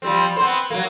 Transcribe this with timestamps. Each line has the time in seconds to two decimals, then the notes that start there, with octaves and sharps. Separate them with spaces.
0.02 F3 G3 C4
0.36 B3 C4 C5
0.70 F#3 A#3